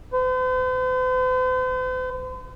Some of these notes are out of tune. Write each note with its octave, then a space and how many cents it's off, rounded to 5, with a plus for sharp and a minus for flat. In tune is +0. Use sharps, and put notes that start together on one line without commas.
C5 -45